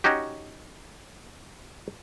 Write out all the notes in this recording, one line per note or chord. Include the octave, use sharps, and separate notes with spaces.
C#4 D#4 F#4 G4